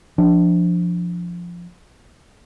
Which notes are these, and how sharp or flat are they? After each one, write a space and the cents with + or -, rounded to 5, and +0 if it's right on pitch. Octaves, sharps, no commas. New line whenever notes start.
F3 +0 D4 +0